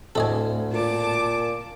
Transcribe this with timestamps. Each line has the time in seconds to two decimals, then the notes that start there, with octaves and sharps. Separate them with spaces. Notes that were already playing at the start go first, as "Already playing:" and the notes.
0.15 D2 A2 A3 C4 A4 D#5 G#5
0.73 A#2 A5 D6